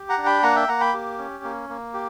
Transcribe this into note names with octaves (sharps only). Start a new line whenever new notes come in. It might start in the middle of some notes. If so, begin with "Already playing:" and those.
Already playing: G4
F#5 A#5
D4
G5 B5
A#3 F#5 A#5
E5 G5
A#3 F#5 A#5
G5 B5
G4
C#4
A#3
A#3
G4